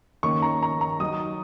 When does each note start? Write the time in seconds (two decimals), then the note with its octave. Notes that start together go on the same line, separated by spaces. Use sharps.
0.23 D#3 A#3 C#4 C#6
0.42 A#5
0.63 A#5
0.81 A#5
1.00 F#3 D#4 D#6